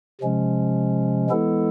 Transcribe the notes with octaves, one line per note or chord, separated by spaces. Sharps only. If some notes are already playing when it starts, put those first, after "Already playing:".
C3 F3 G#3 C#4
E3 G#3 B3 E4 A4